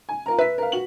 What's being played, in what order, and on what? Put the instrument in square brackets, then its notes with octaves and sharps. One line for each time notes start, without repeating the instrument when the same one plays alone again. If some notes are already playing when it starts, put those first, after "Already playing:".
[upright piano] G#5
F4 A#4 A#5
[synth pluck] B4 [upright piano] E5 B6
[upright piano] A#4 F5
F#4 F#7